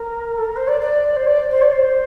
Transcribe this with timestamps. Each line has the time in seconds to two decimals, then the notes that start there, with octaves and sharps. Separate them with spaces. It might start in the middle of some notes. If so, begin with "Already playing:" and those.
Already playing: A#4
0.37 A4
0.44 A#4
0.56 C5
0.67 D5
0.80 D5
1.16 C5
1.27 D5
1.50 C5
1.62 D5
1.72 C5